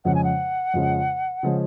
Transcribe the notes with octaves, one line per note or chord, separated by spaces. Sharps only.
F2 C#3 F3 G#3 C#4 F#5
G#5
F#5
F2 C#3 F3 G#3 C#4
C#3 F3 G#3 C#4